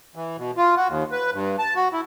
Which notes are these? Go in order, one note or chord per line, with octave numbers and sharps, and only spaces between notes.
E3
B2
F4
F#4
D#2
B4
G2
A5
F#4
E4